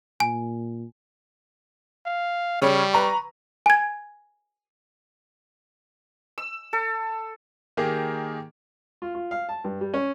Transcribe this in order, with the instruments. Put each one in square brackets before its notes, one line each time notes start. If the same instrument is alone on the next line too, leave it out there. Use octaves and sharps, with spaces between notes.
[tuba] A#2 [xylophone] G#5
[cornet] F5
[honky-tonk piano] C#3 C#5 [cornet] G3
[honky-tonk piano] B4 A#5 C#6
[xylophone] G#5 G#6
[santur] E6
A4
[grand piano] D#3 A#3 G4 G#4
[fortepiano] F4
F4
F5
A5
G2
G3
C#4